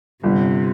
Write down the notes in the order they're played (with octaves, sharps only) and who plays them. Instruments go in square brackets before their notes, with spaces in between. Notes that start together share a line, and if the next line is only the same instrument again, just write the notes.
[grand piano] G1 [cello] C3